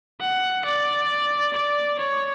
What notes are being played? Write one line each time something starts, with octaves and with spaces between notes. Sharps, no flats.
F#5
D5
D5
C#5